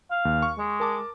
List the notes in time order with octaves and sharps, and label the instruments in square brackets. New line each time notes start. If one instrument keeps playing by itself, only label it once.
[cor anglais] F5
[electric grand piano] D#2
C#6
[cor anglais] G#3
[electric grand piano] A#4 A5 D6